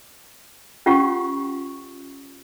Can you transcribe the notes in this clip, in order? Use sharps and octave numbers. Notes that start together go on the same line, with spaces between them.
C#4 F4 G4 F#5 C#6